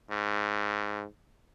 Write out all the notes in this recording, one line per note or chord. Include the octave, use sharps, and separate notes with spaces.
G#2